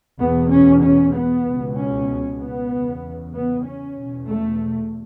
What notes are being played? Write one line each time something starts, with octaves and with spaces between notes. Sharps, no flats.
E2 B2 B3
C#4
C#4
B3
C#2 B2
C#4
B3
E2 C#3
B3
C#4
E2 B2
A3